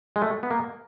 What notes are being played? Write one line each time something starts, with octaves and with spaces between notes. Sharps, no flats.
G#3
A3
B3
A#3